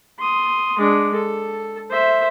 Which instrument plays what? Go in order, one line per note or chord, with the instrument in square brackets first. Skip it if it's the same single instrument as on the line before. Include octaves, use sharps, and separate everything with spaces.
[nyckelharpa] C6 D#6
G#3 D4
A4
C5 E5